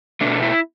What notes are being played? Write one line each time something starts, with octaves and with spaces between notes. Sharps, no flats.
B2 A3 D4
E4